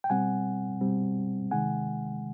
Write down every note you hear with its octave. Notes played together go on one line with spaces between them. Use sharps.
G5
B2 G3 C4 F#5 G#5
B2 G3 C4
C3 D#3 G#3 F#5 G#5